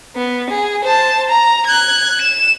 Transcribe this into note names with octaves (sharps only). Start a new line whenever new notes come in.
B3
G#4
C5 A5
A#5
F#6 G#6
E7